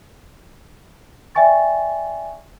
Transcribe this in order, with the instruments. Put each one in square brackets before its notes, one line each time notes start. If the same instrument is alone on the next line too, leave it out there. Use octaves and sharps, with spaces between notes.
[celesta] D5 E5 G5 G#5 C#6 A6